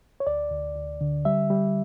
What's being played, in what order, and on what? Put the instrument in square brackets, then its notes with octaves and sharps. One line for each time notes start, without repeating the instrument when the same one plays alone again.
[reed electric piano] C#5
D2 D5
D2
D2
D3
G3 E5
G3